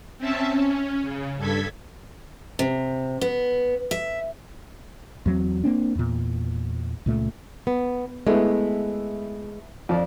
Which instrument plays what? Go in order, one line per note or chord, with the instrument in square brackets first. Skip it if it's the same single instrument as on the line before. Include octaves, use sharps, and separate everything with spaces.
[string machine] C4 C#4 E5 A5
C#4
C#3
G2 A4 G#6 B6
[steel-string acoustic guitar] C3
B3
E5
[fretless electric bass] E2 F#3 G3 C4
A#3 C4 D4
E2 A#2
C#2 A#2 A3
[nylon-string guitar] B3
[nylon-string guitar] G#3 [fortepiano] A3 B3 E4
[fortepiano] F2 D5